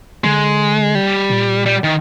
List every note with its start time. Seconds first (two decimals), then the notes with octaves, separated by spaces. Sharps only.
0.24 D3 G#3
0.95 G3
1.30 A#2
1.66 G3
1.84 D#3